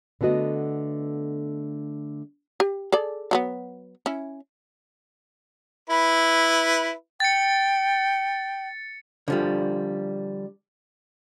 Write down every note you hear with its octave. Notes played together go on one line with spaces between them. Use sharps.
D3 A3 B3 F#4 D#5
G4
G#4 A4 D5
F#3 A3 B3
C#4 E4
E4 B4
G5 A6 C#7
D3 F3 G3